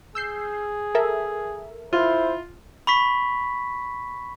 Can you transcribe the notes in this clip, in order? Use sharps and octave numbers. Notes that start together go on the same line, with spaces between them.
G#4 E6 G6 C7
A4 A#4 E5
E4 F4 C5
B5 C#6 B6